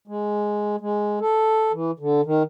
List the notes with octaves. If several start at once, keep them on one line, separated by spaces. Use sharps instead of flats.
G#3
G#3
A4
E3
D3
D#3